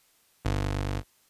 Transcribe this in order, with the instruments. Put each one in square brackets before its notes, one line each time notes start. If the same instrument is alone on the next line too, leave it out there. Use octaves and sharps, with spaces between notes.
[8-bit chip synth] G1